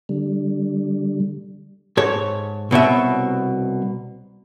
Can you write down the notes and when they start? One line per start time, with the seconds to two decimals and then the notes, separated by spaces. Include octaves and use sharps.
0.09 D3 G3
1.97 G#2 A4 C#5
2.71 C2 B2 C#5 E5